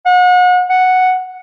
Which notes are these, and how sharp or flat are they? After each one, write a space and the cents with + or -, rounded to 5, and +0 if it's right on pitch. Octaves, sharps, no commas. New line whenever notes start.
F#5 -35
F#5 +0